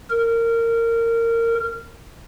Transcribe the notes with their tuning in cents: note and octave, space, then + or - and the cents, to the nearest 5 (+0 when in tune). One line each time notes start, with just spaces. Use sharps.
A#4 -20